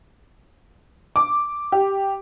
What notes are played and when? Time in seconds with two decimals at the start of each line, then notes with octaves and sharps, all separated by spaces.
1.16 D6
1.72 G4